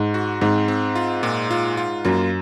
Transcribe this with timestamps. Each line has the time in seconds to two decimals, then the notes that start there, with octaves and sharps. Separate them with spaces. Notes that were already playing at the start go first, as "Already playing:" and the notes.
Already playing: G#2
0.14 F#4
0.41 G#2 C4
0.68 C4
0.95 F4
1.23 A#2
1.51 F4
1.77 F4
2.05 F#2 A#3